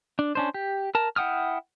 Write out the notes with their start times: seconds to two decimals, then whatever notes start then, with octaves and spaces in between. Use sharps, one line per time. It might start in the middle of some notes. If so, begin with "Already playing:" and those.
0.19 D4
0.35 C#4 D4 C5
0.54 G4
0.95 A#4 A5
1.16 E4 F#5 G5 D#6 F6